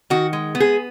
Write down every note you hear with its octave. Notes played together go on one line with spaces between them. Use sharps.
D#3 F#4
G#3
B3
G#4